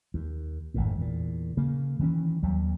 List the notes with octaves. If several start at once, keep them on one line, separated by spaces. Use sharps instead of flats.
D#2
G#1 F2 A2
E2 A#2
C#3 A#3
D#3 E3 A#3 C#4
D#2 F#3 G3